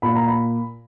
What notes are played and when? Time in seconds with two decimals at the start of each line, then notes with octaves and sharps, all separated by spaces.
0.02 A#2 A#3 B5
0.15 A#5
0.28 B5